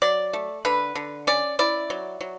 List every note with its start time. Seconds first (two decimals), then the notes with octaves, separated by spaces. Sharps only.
0.02 F#3 D5
0.33 A3
0.65 D3 B4
0.95 D3
1.27 C#4 D5
1.59 E4 D5
1.90 F#3
2.21 F#3